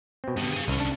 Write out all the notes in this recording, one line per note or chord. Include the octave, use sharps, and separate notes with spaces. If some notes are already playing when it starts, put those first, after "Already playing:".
B2 C4
G2 B2 D3
G#4 F5
C2 C3 C#4
D4 A5